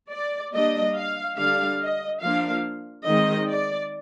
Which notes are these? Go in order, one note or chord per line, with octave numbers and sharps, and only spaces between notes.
D5
G3 A#3 D4 D#5
F5
D3 G3 D4 F5
D#5
F3 A#3 D4 F5
D#3 G#3 C4 D#5
D5